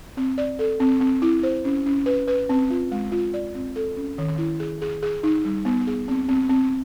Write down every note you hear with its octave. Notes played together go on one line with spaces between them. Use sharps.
C4
D5
A4
C4
C4
E4
C5
C#4
C#4
B4
B4
C4
F4
G#3
F4
D5
C4
A4
C#4
D#3
E4
G#4
G#4
G#4
D#4
G3
B3
G#4
C4
C4
C4